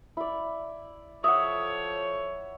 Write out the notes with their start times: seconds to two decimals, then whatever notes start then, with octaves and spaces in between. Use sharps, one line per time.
0.17 E4 D5
1.24 F3 A4 C#5 E5 F#5 D#6